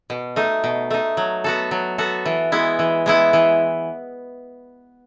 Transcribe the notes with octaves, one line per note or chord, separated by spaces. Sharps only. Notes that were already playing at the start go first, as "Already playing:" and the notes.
B2
A3 D#4
B2
A3 D#4
F#3
B3 F#4 A4
F#3
B3 F#4 A4
E3
G#3 B3 E4
E3
G#3 B3 E4
E3